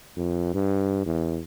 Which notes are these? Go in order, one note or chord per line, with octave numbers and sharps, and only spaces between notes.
F2
G2
E2